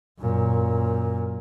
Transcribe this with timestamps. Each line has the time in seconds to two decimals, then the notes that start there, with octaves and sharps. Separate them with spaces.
0.20 F#2 A#2